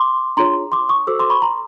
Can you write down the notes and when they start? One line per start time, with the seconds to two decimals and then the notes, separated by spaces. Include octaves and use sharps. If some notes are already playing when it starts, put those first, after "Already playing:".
Already playing: C6 D6
0.37 D4 F4 G#4 C#5 A#5 C6
0.72 C6 D6
0.89 C#6 D#6
1.07 F#4 A4 C5 D6 E6
1.19 C6 D6
1.30 B5 C#6
1.42 A#5 C6